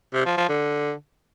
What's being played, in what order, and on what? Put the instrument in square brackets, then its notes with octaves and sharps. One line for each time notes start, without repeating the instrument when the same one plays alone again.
[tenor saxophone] C3
F3
F3
D3